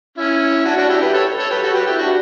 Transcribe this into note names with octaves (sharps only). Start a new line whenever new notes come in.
C#4 E4
D4 F#4
D4 F#4
E4 G4
G4 B4
A4 C#5
A4 C#5
G4 B4
F#4 A4
G4 B4
E4 G4
D4 F#4